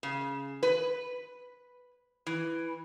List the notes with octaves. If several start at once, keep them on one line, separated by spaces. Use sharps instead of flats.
C#3
B4
E3